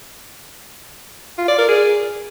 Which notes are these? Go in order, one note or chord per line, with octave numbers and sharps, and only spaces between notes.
F4
D5
A#4
G#4